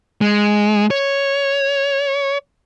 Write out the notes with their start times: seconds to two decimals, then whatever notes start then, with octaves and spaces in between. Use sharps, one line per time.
0.21 G#3
0.91 C#5